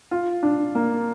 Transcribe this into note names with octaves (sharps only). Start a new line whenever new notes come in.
F4
D4
A#3